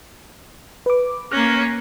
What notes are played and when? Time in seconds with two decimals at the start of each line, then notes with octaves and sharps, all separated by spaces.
0.86 B4 D6
1.32 A#3 C#4 F6 F#6 A#6